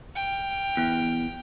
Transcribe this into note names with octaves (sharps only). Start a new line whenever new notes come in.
G5 F6
E2